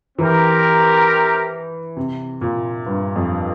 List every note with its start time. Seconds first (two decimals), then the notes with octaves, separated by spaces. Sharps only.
0.18 E3 C4 G4 A#4
1.97 C3
2.41 A#2
2.86 G2
3.16 F2